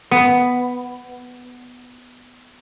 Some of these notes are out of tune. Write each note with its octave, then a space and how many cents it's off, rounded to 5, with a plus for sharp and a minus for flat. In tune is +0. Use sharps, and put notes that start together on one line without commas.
B3 +5